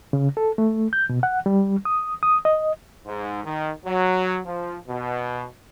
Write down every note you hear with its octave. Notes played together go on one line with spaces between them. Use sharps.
C#3
A4
A3
G6
B2
F#5
G3
D#6
D#6
D#5
G#2
D#3
F#3
F3
B2